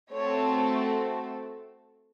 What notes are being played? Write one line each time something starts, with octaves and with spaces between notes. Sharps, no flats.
A3 C4 F#4 A4 C#5